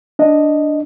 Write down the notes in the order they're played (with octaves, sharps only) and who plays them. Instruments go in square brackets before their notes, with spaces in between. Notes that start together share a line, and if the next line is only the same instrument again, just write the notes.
[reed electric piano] D4 D#5